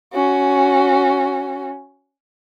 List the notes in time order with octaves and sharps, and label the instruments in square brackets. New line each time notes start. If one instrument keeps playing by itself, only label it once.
[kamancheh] C#4 F#4